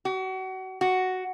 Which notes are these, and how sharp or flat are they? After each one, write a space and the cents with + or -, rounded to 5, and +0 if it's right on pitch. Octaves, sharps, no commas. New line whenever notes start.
F#4 +30
F#4 +5